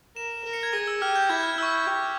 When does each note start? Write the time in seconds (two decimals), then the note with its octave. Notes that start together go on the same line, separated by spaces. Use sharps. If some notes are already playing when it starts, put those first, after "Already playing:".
0.16 A#4 E7
0.44 A#4
0.53 C#7
0.63 G#6
0.73 G#4 A#6
0.87 E6
1.01 G4 F6
1.16 G6
1.29 E4 G#6
1.43 F6
1.58 E4 E6
1.63 C#6
1.68 E6
1.77 C#6
1.86 G4